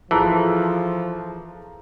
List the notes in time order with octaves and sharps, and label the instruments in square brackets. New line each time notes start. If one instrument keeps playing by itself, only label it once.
[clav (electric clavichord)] E3 [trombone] F3 [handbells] F4 G#4 A4 [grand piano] A5 A#5 F#6